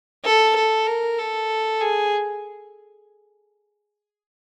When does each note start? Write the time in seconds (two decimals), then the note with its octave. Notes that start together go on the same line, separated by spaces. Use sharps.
0.25 A4
0.56 A4
0.86 A#4
1.18 A4
1.81 G#4